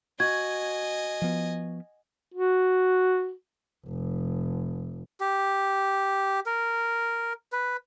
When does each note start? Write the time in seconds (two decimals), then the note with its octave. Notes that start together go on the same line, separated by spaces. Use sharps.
0.20 F#4 D#5 G#5 G#6
1.22 F3 B3
2.34 F#4
3.87 F1
5.20 G4
6.46 A#4
7.52 B4